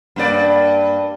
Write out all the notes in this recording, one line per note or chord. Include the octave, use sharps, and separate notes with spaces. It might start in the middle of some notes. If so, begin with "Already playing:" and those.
G2 A#3 D5